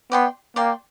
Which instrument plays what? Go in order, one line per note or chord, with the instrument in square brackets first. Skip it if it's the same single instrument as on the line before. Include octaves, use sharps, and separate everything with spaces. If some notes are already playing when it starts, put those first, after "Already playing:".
[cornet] B3 [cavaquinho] D5 G5 C6
[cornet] A#3 [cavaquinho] D5 G5 C6